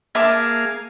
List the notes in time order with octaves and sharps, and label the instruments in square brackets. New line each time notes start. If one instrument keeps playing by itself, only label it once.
[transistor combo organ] A#3 G#4 F5 [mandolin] E5 A5 D6